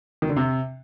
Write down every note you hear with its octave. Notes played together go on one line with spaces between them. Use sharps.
D#3
D3
C3